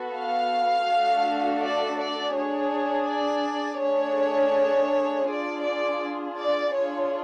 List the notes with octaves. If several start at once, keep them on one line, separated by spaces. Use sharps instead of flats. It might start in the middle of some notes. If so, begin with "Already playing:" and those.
Already playing: B3 F#4 A4
F5
A3 D4 F#4 A4
D5
D5
D4 G#4 C#5
D5
A3 D4 G#4 C#5
D4 F4 G#4 D5
D5
D5
D4 F4 G#4 C#5